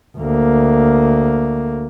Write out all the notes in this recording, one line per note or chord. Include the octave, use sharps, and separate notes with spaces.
D2 A#3